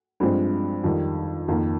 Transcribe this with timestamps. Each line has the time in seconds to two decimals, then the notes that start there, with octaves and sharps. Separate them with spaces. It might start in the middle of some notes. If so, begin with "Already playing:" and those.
0.20 G2 F3 G#3 C4 F4
0.84 F2 D#3 G3
1.48 F2 D#3 A#3 F4